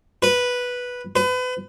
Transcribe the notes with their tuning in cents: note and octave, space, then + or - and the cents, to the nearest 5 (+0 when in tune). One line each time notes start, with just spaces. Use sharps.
B4 -5
B4 +35